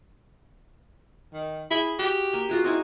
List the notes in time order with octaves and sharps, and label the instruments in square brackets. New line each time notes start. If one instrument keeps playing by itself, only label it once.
[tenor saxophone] D#3
[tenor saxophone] E4 [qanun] G#4
[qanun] F#4 [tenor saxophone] G4
[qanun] A#3
F4 F#4 G#4
[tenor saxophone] C4 [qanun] D#4 E4 G#5